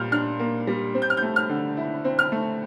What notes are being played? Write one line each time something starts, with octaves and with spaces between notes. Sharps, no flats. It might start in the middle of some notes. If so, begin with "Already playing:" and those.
Already playing: A#2 G3 A#3 F6 G6
D4 F6
A#3
G3
C4
G6
F6
G6
A3
F6
D3
E4
C4
F6
A3